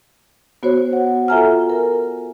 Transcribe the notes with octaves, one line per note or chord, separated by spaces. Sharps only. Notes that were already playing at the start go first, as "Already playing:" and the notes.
B3 F#4 C5 C#5
F#5
F4 A4 E5 G#5 A#5 F6
A#4